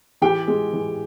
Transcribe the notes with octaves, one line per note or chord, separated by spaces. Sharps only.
E3 G4 G5
G#3
E3